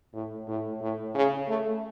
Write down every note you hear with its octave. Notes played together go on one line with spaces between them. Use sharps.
A2
A2
A2
C#3
A3